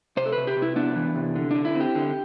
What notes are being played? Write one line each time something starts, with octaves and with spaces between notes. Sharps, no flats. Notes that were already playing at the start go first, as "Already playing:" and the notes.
C3 C5
A4
C3 B4
G4
C3
E4
B3 D4
E3
C3
D3
D3 D4
E4
C4
G4
D3